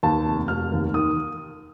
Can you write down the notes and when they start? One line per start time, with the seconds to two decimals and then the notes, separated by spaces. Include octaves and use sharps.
0.03 D#2 A5
0.26 F1
0.48 F1 F6
0.72 D#2
0.94 D#3 D#6